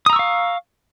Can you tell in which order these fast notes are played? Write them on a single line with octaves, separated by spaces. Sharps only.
D#6 A#5 E6 C#6 F5